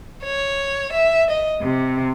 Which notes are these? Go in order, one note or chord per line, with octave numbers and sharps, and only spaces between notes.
C#5
E5
D#5
C3